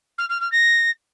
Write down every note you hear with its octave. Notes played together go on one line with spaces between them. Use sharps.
F6
F6
F6
A#6